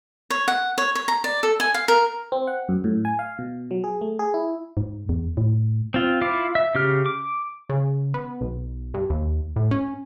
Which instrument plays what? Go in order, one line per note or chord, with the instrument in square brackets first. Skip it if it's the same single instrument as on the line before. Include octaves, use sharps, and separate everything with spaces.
[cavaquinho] C#5
F#5
C#5
C#5
A#5
D5
A4
G#5
F5
A#4
[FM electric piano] C4
F#5
F#2
A2
G#5
F5
B2
F#3
G#4
A3
G#4
E4
[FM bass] G#2
E2
A2
[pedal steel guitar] C4 F4
E4 F4 F5 D6
E5
C#3 G4 F6
D6
[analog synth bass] C#3
B3
B1
G2
D#2
A2
C#4